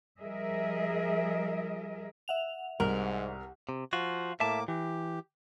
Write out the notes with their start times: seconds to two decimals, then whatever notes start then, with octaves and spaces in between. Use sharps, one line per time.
0.21 F3 G3 G#4 A#4 D#5 E5
2.28 E5 F#5 F7
2.80 C2 G#2 A#4 F#5
3.69 C3
3.93 F3 F4 F#4
4.40 A2 A#3 E5 A5 D6
4.68 E3 G4